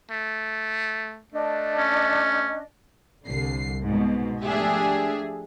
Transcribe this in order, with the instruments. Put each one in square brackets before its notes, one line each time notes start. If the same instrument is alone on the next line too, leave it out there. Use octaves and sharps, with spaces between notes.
[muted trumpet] A3
[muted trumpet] A3 [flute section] D4 D#5
[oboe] C#4
[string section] C2 D3 C7
G#2 B2
F3 A3 D4 G4 G#4 E5